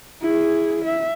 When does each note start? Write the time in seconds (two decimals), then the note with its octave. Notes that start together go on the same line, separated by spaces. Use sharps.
0.22 E4 G#4
0.85 E5